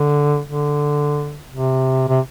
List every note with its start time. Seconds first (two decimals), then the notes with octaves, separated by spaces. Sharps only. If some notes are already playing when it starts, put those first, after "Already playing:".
Already playing: D3
0.48 D3
1.51 C3
2.08 C3